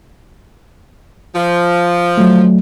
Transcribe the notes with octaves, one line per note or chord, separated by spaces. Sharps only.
F3
F#3 A3